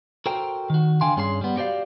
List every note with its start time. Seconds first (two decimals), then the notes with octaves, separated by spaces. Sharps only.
0.26 F#4 A4 A#4 C5 G5
0.70 D#3 F#4
1.01 D3 F5 G5 G#5 C6
1.16 G2 C#4 G#4 A4 C6
1.41 G3 B3
1.56 F#4 G4 C5 D5 F5